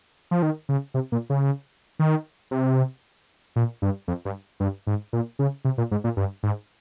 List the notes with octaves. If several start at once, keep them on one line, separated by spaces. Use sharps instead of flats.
F3
D#3
C#3
C3
A#2
C#3
D#3
C3
A#2
G2
F2
G2
G2
G#2
A#2
C#3
C3
A#2
G#2
A#2
G2
G#2